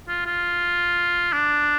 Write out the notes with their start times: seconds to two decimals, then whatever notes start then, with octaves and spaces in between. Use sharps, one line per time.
0.08 F4
0.26 F4
1.33 D4